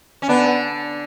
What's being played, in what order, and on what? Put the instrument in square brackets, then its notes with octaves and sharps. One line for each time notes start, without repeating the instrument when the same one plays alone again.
[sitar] C#4
[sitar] D3 D4 [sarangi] B3